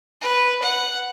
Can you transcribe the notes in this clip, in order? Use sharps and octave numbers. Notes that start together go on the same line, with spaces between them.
B4
F#5